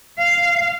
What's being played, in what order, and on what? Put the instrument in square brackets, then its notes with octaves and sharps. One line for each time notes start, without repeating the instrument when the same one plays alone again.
[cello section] F5